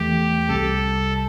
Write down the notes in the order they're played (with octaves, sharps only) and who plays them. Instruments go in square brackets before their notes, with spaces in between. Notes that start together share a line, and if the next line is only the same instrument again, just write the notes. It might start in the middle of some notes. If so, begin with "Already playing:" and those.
Already playing: [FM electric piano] E2 E3 A3 [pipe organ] G4
[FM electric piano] C2 C3 G3 [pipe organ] A4